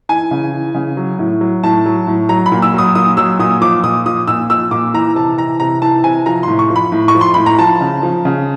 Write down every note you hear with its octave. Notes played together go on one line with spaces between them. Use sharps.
E3 G#5
C#3
E3
C#3
F#3
A2
F#3
A2 A5
F#3
A2
F#3 A#5
B5
A#2
E6
F#3 D#6
A#2 D#6
F#3 E6
A#2 D#6
F3 D6
A#2 D#6
F3 D#6
A#2 E6
F3 E6
A#2 D6
E3 A#5
C3 A5
E3 A#5
C3 A#5
E3 A5
C3 G#5
F3 A#5
A2 C6
C#6
F3
B5
A2
C#6
F3
C6
A2 B5
A#5
F3 A5
C#3
F3
C#3